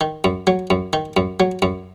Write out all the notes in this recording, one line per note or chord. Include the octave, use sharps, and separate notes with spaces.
D#3
F#2
F#3
F#2
D#3
F#2
F#3
F#2